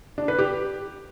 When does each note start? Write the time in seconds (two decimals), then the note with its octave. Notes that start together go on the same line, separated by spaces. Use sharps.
0.18 D4
0.28 B4
0.39 G4